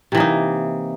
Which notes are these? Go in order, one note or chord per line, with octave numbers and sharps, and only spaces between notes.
C3 E3 A#3 D#4